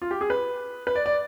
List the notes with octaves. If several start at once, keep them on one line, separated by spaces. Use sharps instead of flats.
F4
G4
G#4
B4
B4
D5
D5